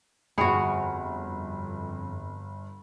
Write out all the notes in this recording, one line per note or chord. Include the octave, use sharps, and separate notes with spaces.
G1 F2 F#4 G#4 G5 G#5 B5